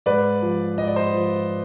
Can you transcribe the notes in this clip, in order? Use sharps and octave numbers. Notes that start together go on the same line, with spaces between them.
G#2 B4 D5
F3
G#2 D#5
D5
C5 D#5
F3